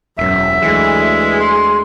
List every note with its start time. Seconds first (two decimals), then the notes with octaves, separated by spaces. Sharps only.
0.18 E1 F#2 E5
0.62 D2 E3 G#3
1.40 C6